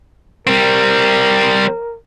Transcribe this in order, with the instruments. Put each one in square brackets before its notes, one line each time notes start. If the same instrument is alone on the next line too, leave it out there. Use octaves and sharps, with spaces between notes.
[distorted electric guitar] G3 C4 [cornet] A#4